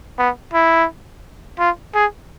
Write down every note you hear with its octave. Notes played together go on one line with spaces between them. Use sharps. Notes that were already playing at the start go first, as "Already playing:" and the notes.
B3
E4
F4
G#4